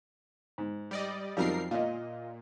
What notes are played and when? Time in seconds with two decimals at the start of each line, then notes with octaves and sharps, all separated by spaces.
0.58 G#2
0.91 G3 D5 D#5
1.37 F2 F#3 G3 D#4 A#4 C7
1.71 A#2 F4 D#5